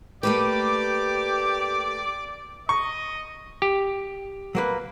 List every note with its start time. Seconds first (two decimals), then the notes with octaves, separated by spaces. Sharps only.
0.23 A3 A#3 G4 B4 D5 D6
2.69 D#5 C#6
3.62 G4
4.55 F#3 A#3 B4